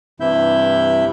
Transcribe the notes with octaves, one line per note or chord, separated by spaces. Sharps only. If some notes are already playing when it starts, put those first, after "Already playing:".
G2 C3 E3 E4 E5 G6